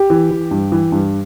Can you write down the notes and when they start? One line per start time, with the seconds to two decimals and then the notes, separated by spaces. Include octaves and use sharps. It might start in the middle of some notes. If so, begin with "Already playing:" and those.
Already playing: G4
0.10 E3
0.31 E3
0.51 G2
0.72 E3
0.92 G2